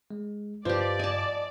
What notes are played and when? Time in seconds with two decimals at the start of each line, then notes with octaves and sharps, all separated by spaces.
0.11 G#3
0.65 G2 F3 G4 B4 C5 D5 D#5
0.99 D#5 G#5 A5